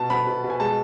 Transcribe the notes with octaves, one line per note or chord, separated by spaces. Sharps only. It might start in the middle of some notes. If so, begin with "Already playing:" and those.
Already playing: B2 A5
B3 B5
B2
B2
G#5
G#3 A5